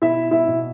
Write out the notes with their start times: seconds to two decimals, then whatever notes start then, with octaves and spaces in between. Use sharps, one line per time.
0.02 B2 E4 E5
0.31 E4 E5
0.47 B2